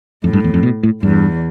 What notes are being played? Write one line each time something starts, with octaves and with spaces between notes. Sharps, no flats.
F2 A2
G2
E2
F2
B2
A2
E2 G2